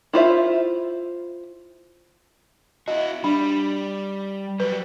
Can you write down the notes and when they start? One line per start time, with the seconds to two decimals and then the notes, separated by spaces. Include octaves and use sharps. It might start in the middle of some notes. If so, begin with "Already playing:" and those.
0.13 E4 F4 C5 E5
2.88 E4 F#4 D#5
3.24 G3 D4
4.60 F#3 G3 B4